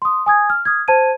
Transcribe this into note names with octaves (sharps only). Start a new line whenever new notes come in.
C6 D#6
G#5 D#6 G#6
F6
D#6 F6 G#6
C5 A5 G#6 D#7